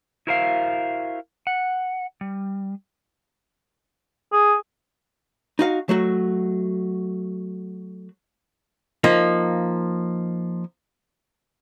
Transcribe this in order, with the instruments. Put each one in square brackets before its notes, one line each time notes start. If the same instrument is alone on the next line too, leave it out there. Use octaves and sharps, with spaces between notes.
[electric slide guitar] E4 F#4 A#4 C5 E5 F5
F#5
G3
[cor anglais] G#4
[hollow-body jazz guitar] D#4 F#4 F5
F#3 A3 F#4
F3 A#3 D#4